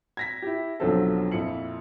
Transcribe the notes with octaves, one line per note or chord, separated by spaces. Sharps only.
G#6 A#6 B6
E4 G4
B1 D3 F3 F#3 C4 A4
F2 A#2 E4 C#7 F#7